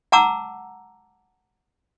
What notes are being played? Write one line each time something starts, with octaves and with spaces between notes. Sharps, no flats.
F#5 A5 A#5 D6 E6